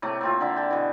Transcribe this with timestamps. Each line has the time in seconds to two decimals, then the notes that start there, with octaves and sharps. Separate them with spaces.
0.02 A2 C3 A3 A#3
0.21 A#3 C4 F4
0.40 D3 A#4 E5
0.56 G5 A5
0.71 B2 E3